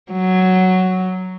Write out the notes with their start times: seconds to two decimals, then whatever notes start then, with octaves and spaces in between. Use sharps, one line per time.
0.12 F#3